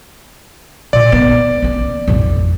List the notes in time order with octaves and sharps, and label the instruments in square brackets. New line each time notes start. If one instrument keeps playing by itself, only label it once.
[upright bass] A#2 [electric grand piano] D5
[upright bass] B3
A#3 C#4
A1 F2